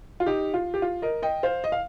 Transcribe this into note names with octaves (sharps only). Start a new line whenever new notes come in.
F4
D#4 G4
F4
G4
F4
A#4 D#5
D#5 G5
C5 F5
D#5
F5